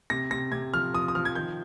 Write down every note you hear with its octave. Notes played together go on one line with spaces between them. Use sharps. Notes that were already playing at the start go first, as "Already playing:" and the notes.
C3 A#6
C3 A#6
C3 G#6
F3 F6
F3 D#6
D#6
F3 F6
G#6
D#3 G6